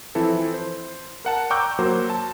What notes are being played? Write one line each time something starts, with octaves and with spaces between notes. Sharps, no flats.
E3 F3 C4 E4 A4
C5
A#4 F#5 A5
G5 A#5 C#6 D6 E6 G6
F#3 A#3 F#4 A#4 C5
A5